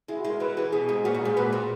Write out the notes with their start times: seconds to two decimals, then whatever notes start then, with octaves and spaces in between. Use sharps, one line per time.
0.08 G#3 E4
0.19 F#4
0.25 G#3
0.30 A#4
0.40 F#3 B4
0.57 E3 G#4
0.73 B2 G#4
0.89 G#2
0.95 G#4
1.04 A#2 F#4
1.14 G#2
1.21 G#4
1.25 G#2
1.36 A#2 B4
1.53 A#2